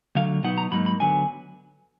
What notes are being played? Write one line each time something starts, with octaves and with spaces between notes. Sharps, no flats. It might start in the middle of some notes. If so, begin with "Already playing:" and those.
D2 D3 F#3 F5
B2 F#3 B3 D#4 F#5
A#5
G#2 F#3 A#3 D#4 B5
B5
D2 D3 F#3 B3 G#5